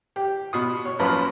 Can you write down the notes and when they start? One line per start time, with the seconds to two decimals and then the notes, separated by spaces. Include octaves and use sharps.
0.16 G4
0.53 B2 D#6
0.86 C#5
0.99 A#1 F#2 F3 B4 B5